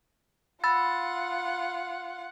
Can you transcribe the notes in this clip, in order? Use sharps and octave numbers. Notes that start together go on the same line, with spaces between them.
F4 F#5 B5 E6 A6